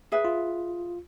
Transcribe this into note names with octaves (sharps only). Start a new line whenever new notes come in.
G#4 B4 E5
F4